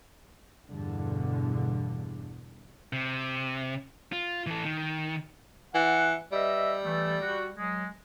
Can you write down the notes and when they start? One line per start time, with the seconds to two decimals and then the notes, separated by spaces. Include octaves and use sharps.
0.68 E2 G2 B2 D3
2.93 C3
4.12 F4
4.47 E3 A4
4.65 D#3
5.74 E3 F#5
6.32 G3 B4 D#5 E5
6.84 E3 A3
7.22 F#4
7.57 F#3 G#3